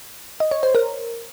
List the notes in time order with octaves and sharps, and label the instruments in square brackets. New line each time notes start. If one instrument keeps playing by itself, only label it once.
[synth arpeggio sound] D#5
C#5
C5
A#4